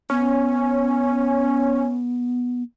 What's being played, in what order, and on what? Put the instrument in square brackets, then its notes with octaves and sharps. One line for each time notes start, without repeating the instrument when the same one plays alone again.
[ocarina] B3 [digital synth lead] C#4